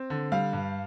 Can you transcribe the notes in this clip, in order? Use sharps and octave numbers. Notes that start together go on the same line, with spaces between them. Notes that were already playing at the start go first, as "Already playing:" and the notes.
Already playing: C4
D3
G3 F5
G2